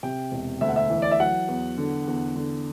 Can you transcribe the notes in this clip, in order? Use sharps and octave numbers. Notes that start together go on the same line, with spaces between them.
C3 G5
E1
D2 E5
F#5
E5
E3
D5
E5
F#3 F#5
E2
D3
E2
D3